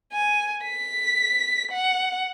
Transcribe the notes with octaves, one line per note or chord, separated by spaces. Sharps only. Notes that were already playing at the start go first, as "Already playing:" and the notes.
G#5
B6
F#5